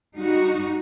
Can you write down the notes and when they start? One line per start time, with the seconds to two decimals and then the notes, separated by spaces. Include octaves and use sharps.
0.15 G3 D#4 F#4